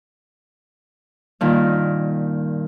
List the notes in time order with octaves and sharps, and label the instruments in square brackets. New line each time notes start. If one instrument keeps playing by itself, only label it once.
[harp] G2 A#2 D#3